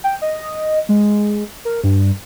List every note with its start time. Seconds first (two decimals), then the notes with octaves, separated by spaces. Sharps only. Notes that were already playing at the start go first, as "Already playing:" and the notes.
0.04 G5
0.22 D#5
0.89 G#3
1.65 A#4
1.84 G2